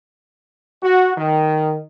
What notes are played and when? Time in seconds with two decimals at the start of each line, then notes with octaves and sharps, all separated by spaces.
0.83 F#4
1.16 D#3